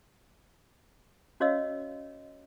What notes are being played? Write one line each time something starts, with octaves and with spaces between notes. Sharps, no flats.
C#4 F#4 C#5 D#5 F5 E6